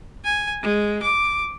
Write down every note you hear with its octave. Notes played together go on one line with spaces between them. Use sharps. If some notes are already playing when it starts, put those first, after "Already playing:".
G#5
G#3
D6